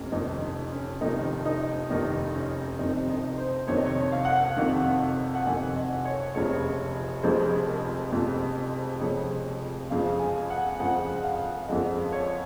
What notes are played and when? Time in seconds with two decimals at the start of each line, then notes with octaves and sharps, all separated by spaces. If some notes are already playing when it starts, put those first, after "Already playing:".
Already playing: F1 F2 C#4
0.12 F1 F2 D#3 D#4
0.41 D#4
0.72 C#4
1.01 F1 F2 D#3 D#4
1.45 D#4
1.90 F1 F2 D#3 D#4
2.34 C#4
2.79 F2 C3 D#3 D#4
3.09 D#4
3.38 C5
3.68 F2 C3 D#3 C#5
3.77 D#5
3.86 C#5
4.12 F5
4.25 F#5
4.36 F5
4.56 F2 C3 D#3
5.35 F#5
5.46 F2 C3 D#3 G#5
5.76 D#5
6.05 C#5
6.35 F1 F2 C#3 F3 G#3 C#5
7.23 F1 F2 C#3 F3 G#3 C5
7.68 A#4
8.12 F1 F2 C#3 F3 G#3
9.01 F1 F2 C#3 F3 G#3 C#5
9.90 F2 C#3 F3 G#3 F5
10.20 G#5
10.50 F#5
10.80 F2 C#3 F3 G#3 F#5
11.17 F#5
11.24 F5
11.63 F5
11.68 F2 C#3 F3 G#3 D#5
12.12 C#5